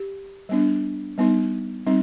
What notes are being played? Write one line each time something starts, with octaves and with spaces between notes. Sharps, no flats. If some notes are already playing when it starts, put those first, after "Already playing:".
Already playing: G4
G3 B3 D4
G3 B3 D#4
G3 C4 D#4